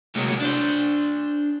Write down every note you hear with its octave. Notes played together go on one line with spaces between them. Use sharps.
A2 C3 F#3 G#3 A#3 F#4
D4 C5